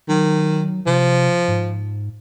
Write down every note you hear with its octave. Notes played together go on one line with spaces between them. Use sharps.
D#3 F#3
C3 F3
G#2